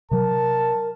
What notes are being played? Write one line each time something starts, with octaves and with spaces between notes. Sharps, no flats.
C3 F#3 A#4 A5